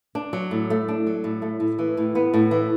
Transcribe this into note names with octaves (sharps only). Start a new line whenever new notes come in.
D4
F#3
A2
A3
D4
F#3
A2
A3
A2
E3
A2
B3
A2
E3